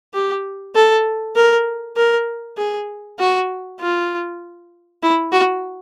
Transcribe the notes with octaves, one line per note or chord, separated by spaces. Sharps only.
G4
A4
A#4
A#4
G#4
F#4
F4
E4
F#4